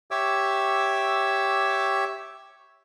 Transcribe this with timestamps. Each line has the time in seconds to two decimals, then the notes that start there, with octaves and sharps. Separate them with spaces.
0.11 G4 C#5 E5 D6 E6